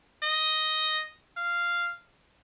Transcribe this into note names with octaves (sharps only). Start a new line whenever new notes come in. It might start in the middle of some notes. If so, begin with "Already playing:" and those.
D#5
F5